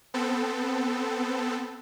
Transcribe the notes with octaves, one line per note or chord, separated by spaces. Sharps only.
B3 C4 A4